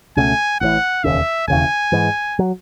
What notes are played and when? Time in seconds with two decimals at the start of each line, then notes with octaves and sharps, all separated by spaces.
0.17 C#2 B2 A3 C#4 G#5
0.60 A1 A2 E3 F#5
1.04 E1 D#2 C#3 E5
1.48 E1 D#2 C#3 E3 G#5
1.92 G#2 E3 G#3
2.39 F#3